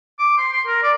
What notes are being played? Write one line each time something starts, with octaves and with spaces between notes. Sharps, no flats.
D6
C6
C6
A#4
D5